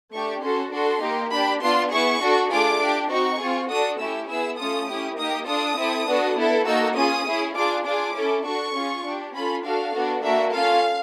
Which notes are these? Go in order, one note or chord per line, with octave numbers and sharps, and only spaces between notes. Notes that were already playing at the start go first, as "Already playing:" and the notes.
A3 D4 G4 C#6
C#4 F#4 A4 C6
D4 F#4 A4 C6
A#3 D#4 G4
D4 G4 B5
B3 D4 F4 C6
B3 E4 G#4 C#6
D4 F#4 A4
A3 D4 F4 G#4 D6
D4 G4
C4 D#4 F#4 C#6
C4 F4 G#4
D4 F#4 A4 D#6
A3 C#4 E4 G4 E6
B3 E4 G#4 E6
A3 C#4 F4 A4 D#6
C#4 E4 G4
A#3 D#4 G4 D#6
D4 F4 A4 D#6
C4 E4 A4
B3 D4 F#4 A4
B3 E4 A4
A#3 D#4 F#4 A4 E6
C#4 F4 G#4 D#6
C#4 E4 G#4
D4 F4 G#4 D6
D4 F4 G#4 D6
C#4 E4 A4
D4 F#4 A4 C#6
C#4 F4 G#4
D4 G4
C#4 F4 A4 B5
D4 F#4 A4 F5
B3 D4 F#4 A4
A#3 D4 F#4 E5
C#4 F4 A4 F5